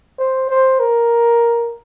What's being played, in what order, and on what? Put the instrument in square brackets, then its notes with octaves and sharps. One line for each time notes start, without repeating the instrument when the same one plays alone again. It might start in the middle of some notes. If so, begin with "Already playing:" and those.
[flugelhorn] C5
C5
A#4